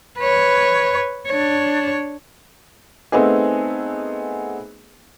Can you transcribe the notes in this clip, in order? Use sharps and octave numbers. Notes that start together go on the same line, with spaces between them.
B4 C#5
D4 C#5
A3 B3 C4 D#4 G#4